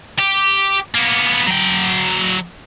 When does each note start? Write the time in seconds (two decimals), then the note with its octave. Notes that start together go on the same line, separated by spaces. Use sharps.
0.19 G4
0.95 A#3 B3
1.47 F#3 G5